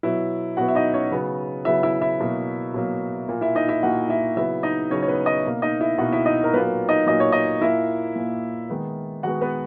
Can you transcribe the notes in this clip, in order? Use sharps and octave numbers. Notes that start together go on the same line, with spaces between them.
B2 F#3 B3 E4 E5
B2 F#3 B3 F#4 F#5
E5
D#4 D#5
C#4 C#5
C#3 F#3 B3
C#3 F#3 B3 E4 E5
E4 E5
E4 E5
B2 F#3 A#3
B2 F#3 A#3
A#2 A#3
E4 E5
D#4 D#5
E4 E5
A#2 A#3 F#4 F#5
E4 E5
C#3 F#3 B3 E4 E5
D#4 D#5
C#3 F#3 B3 C#4 C#5
C#5
B3 B4
D#4 D#5
B2 A#3
D#4 D#5
E4 E5
B2 A#3 F#4 F#5
E4 E5
D#4 D#5
A#4
A#2 F#3 A#3 B3 B4
D#4 D#5
A#2 F#3 A#3 D#5
C#5
D#4 D#5
A#2 A#3 E4 E5
A#2 A#3
D#3 G#3 B3
D#3 G#3 B3 F#4 F#5
B3 B4